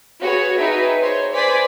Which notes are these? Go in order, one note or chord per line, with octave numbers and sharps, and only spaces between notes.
F#4 G#4 B4 C#5
D#4 G#4 B4 E5 G5
C5 C#5
B4 C5 D5 G#5 B6